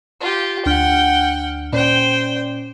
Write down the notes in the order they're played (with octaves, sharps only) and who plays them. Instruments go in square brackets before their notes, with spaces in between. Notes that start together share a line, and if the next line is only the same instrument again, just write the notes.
[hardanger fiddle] F4 G4
[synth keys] D2 D4 F6 [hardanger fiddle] F#5 G5
[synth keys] A#2 C#4 D5 [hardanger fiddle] C5 G5